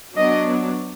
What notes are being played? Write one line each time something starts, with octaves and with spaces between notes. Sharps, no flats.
F#3 B3 D4 D#5